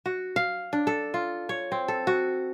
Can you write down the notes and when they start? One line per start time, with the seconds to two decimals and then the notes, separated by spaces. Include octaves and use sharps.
0.06 F#4
0.36 F5
0.73 D4
0.87 A4
1.14 F4
1.49 C#5
1.72 C4
1.88 A4
2.07 F#4